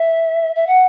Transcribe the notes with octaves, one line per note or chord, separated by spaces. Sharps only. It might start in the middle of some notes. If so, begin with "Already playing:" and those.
Already playing: E5
E5
F#5